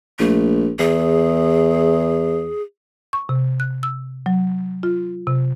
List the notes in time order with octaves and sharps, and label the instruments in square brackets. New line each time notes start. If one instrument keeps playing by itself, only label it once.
[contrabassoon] A#1 [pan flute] A3
[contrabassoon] E2 [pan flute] G#4
[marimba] C#6
C3
F#6
E6
F#3
F4
C3